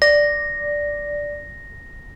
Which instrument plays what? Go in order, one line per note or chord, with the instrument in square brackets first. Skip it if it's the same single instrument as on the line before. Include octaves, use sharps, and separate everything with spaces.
[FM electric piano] D5 [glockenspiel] A#6